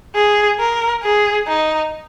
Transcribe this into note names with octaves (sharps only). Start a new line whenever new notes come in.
G#4
A#4
G#4
D#4